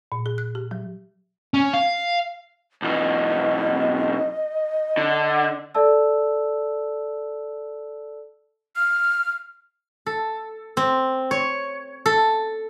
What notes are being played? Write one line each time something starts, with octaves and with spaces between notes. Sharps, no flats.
A#2
G#4
F#6
G4
F#3
C#4
F5
B1 E3 D#5
D3
A4 D5 E5 A5 E6
F6
A4
C4
C#5
A4